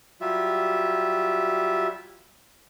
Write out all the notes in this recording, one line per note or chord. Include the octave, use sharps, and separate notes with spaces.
F#3 G3 F4 G4 E5